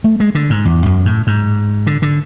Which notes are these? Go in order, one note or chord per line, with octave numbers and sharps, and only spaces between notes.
A3
G#3
D3
G#2
E2
F#2
A2
G#2
D3
D3